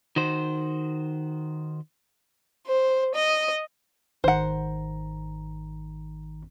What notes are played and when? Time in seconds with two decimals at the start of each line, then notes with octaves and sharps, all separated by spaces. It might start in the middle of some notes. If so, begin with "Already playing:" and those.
0.16 D#3 F#4 C5
2.67 C5
3.14 D#5
4.24 G#1 D#3 C5 F#5 A#5